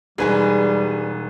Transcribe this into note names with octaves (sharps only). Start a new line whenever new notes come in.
E1 G3 G#3 D#4 G#4 B4 G#5